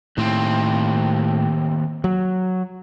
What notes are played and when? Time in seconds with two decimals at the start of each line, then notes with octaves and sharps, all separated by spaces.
0.18 D#2 A2 C4
2.04 F#3